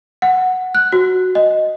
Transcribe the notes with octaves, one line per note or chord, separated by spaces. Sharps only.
F#5
F#6
F#4
D#5